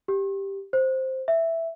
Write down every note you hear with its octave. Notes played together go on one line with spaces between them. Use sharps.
G4
C5
E5